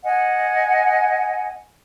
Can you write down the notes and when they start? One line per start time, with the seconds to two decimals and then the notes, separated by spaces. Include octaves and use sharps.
0.04 D#5 F#5 G#5